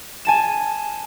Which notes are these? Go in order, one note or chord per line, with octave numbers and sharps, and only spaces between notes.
G#5 A5 E7